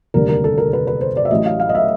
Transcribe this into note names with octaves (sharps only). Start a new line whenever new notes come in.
F1 D#2 D3 G3 A#4
A#4
A4
A#4
B4
B4
C5
D5
E5
A1 A2 F#3 D#5
F5
F5
D#5
E5